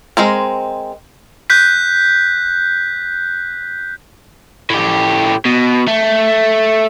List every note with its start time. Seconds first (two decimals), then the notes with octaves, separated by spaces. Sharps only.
0.17 G#3 C4 A#4
1.50 F#6 G6 B6
4.70 A2 G4
5.46 B2
5.88 A3